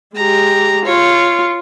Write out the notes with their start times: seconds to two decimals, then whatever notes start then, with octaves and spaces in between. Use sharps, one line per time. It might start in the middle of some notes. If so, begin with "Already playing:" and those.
0.16 G#3 G4 A#5
0.85 F4 C#5